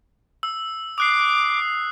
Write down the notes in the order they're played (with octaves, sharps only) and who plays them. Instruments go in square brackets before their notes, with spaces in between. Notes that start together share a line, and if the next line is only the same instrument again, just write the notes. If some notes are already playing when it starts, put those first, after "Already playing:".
[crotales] E6
[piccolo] D6 [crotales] D#6 F#6 C7